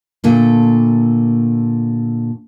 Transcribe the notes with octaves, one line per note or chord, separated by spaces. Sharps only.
A#2 D3 A3 A#3